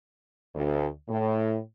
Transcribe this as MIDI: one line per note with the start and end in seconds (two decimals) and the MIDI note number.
0.55 0.87 38
1.09 1.57 45